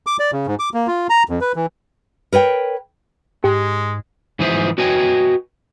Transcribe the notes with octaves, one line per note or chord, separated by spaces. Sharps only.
D6
D5
C#3
G#2
D6
A#3
F4
A#5
F2
B4
E3
A#4 B4 C#5 G5
G#2 G#3 G4
G#2 E3 F3 G#4 C5 E5
F#4 B4 C#5 D#5 G5 G#5